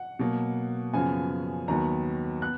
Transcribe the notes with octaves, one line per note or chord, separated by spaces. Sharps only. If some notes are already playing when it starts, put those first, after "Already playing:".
Already playing: F#5
B2 F#3 A#3
F#2 C#3 F3 B3 G#5
D#2 D#3 F#3 B3 A#5
B3 F#6